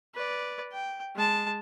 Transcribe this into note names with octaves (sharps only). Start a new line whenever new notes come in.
B4 D5
G5
G#3 A5